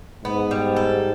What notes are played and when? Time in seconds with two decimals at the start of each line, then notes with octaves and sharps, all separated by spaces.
0.24 G#2 B3
0.51 G3
0.76 A4